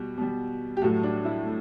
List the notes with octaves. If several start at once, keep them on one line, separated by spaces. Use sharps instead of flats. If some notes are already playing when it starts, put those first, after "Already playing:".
Already playing: B2 G3 F#4
B2 G3
G4
A2 F#3 A3 F#4
D4
E4
A3